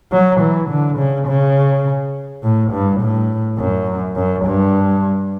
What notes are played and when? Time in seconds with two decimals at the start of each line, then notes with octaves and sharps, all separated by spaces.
0.12 F#3
0.40 E3
0.70 D3
0.98 C#3
1.27 C#3
2.43 A2
2.72 G2
3.01 A2
3.58 F#2
4.16 F#2
4.45 G2